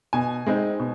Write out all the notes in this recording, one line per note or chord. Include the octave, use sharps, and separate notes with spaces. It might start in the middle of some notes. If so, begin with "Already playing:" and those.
B2 G#5
G#3 C4 D#4
B2